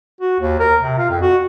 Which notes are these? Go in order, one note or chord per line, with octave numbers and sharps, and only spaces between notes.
F#4
D#2
A#4
C3
F4
F2
F#4